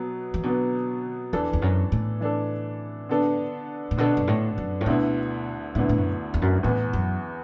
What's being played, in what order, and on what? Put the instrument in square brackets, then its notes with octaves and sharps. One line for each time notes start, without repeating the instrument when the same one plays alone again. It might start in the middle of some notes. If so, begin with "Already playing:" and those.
Already playing: [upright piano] B2 F#3 B3
[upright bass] E3
[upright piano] B2 F#3 B3 [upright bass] D3
[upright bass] E2 [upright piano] E3 D4 A4
[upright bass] E2
F#2
A2
[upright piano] E3 D4 A4
D3 B3 D4 A4
[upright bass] A2
[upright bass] B2 [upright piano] D3 B3 D4 A4
[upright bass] F#2
A2
F#2
A2
[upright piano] D2 D3 B3 E4 [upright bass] B2
[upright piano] D2 D3 B3 E4 [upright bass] A2
[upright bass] A2
F#2
E2
F#2
[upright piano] E2 E3 B3 [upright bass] A2
[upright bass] F#2